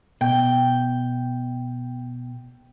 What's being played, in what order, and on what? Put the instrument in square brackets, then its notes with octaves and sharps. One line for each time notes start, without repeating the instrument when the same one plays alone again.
[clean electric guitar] B2 [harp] G5